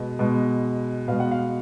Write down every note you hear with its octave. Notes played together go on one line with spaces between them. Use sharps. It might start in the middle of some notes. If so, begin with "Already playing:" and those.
Already playing: B2 G#3
B2 G#3
B2 G#3 F5
F#5
F5